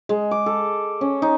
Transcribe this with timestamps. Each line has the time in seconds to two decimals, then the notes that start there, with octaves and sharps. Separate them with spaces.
0.09 G#3
0.31 D6
0.46 A4
1.01 C#4
1.22 D#4